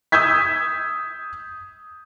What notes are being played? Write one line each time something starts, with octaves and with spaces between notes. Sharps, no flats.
D#6 E6 G6 G#6 B6